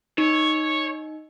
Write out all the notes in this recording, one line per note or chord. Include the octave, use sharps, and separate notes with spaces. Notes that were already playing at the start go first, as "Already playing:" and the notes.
D#4 C#5